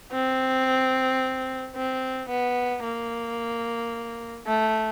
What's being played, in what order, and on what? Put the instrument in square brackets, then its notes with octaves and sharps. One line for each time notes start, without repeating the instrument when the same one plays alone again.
[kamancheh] C4
C4
B3
A#3
A3